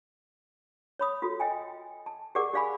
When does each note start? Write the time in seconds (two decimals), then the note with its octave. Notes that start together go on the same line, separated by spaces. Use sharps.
0.99 C#5 B5 D#6
1.22 F4 F#4 A4
1.40 D#5 G5 G#5
2.06 A5
2.35 G4 G#4 A#4 D5 F#5 D6
2.54 G4 D5 F5 G#5 B5